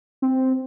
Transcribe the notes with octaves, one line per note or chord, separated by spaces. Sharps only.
C4